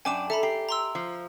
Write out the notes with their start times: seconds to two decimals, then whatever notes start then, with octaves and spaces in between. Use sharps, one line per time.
0.05 F#2 D4 G5 G#5 D6 E7
0.30 A4 E5 A#5 B5
0.43 G4 C7
0.69 A#5 C6 E6
0.95 F3